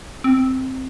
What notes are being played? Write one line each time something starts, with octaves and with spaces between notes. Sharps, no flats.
C4